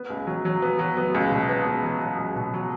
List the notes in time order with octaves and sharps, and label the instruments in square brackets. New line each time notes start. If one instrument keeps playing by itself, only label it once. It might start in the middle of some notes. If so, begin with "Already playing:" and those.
Already playing: [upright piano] B3
C#2
F#3
F#3
B3
F#3
B3
C#2
B2
B3
C#2
F#3
F#3
C#2
B2
F#3